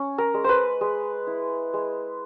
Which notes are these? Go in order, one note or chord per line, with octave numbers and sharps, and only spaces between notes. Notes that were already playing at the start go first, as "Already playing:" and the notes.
Already playing: C#4
A#4
G#3
B4 C5
G#3
E4
G#3